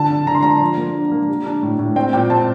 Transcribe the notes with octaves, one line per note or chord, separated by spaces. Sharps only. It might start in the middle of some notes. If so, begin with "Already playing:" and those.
Already playing: D3 A5
D3
D3 A#5
C6
D3 A#5
F3
A#3
D4
A#3
G3
D4
A2
A2
C4 G5
A#2 G5
C4 A5